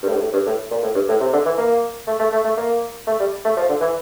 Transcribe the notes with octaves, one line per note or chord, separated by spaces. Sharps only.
G2
A2
G2
A2
G2
A2
A#2
A2
G2
A2
C3
D3
E3
A#3
A3
A3
A3
A3
A#3
A3
G3
A3
F3
D3
E3